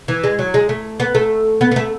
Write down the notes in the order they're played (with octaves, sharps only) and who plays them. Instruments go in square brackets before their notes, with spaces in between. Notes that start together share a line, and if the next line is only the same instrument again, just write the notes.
[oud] E3
G#3
F#3
G#3
A3
B3
A3
B3
B3
A3